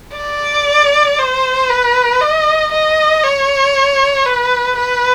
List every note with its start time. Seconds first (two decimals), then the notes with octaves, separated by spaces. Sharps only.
0.16 D5
1.19 C5
1.70 B4
2.21 D#5
2.72 D#5
3.24 C#5
4.26 B4
4.77 B4